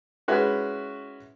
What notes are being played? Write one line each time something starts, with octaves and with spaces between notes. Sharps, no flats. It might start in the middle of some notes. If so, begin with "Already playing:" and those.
G#3 C#4 E4 F#4 B4